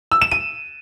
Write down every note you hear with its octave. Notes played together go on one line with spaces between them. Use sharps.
E6
E7
D#7